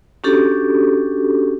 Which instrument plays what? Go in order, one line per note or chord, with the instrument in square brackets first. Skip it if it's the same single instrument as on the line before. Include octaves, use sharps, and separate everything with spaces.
[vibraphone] C#4 D4 F#4 G4 A4